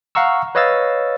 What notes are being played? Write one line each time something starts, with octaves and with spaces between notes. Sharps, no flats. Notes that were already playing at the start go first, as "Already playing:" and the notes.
F5 F#5 A#5 C#6 E6
B4 C#5 D#5 F5 E6 A6